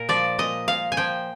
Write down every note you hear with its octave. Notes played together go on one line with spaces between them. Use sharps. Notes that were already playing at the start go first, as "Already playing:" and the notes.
Already playing: A#2 A#4
F3 D5
A#2 D#5
A#2 F5
G#5
F3 G5